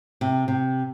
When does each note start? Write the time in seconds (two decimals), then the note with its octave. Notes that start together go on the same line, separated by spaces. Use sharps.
0.21 C3
0.48 C3